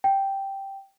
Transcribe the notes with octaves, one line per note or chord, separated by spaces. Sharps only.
G5